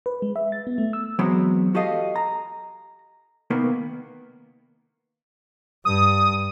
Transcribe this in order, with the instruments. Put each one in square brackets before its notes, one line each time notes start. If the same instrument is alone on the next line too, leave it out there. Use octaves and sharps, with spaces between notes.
[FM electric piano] B4
G#3
E5
A6
B3
A3
E6
[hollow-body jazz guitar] E3 F#3 G#3 B3 C4 C5
F#4 G4 A4 D#5 F5
A#5
C3 D#3 A#3 B3
[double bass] G2 [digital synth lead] D#6